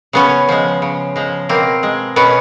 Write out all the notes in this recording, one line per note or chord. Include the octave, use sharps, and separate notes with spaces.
C#3 B3 C#4
F3 G#3
C#3
F3 G#3
B2 A#3 C4
G#3
B2 B3 C#4